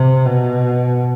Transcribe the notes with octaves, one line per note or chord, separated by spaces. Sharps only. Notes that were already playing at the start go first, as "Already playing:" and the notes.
Already playing: C3
B2